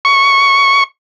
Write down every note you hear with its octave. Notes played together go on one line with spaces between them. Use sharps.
C#6